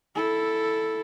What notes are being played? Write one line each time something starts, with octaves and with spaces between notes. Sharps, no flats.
E4 A4